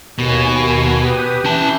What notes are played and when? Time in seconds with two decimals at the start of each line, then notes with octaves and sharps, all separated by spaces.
0.19 D#2 B2 G#5
0.98 G4 B4 D#6
1.45 E3 C#4 A5 G6